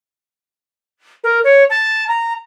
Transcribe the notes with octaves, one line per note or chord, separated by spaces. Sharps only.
A#4
C#5
A5
A#5